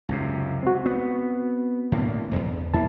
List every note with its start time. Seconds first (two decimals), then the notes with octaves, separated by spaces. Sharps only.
0.09 C#2 F#2 C3
0.63 C4 F#4
0.86 B3
1.92 A2 D3 A#3
2.31 D#1 E2
2.74 E2 A#3 E4 A5